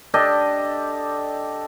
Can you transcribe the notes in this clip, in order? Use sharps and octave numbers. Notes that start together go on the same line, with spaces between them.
D4 G4 A4 D#5